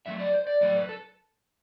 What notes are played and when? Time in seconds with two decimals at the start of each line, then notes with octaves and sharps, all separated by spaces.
0.06 A2 F#3 A3 E5
0.19 D5
0.33 C5
0.47 D5
0.61 A2 F#3 A3 D5
0.76 B4
0.89 A4